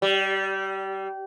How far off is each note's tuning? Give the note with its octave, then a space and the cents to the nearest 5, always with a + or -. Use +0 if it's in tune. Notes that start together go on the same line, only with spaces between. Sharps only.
G3 -25